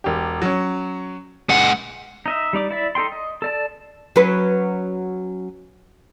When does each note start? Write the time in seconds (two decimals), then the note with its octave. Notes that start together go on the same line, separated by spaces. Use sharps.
0.04 E1 G4
0.42 F#3 C#4
1.49 C#2 G#3 F#5
2.26 D#4 D#5 E5
2.53 G3 D#4 D5 D6
2.71 E4 D5 E5
2.95 D#4 A4 G5 C6
3.12 D#5
3.42 A4 D5 A5
4.16 F#3 C#4 B4